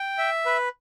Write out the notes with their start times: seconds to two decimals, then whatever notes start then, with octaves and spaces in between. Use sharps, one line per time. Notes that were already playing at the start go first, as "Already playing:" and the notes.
Already playing: G5
0.18 E5
0.46 B4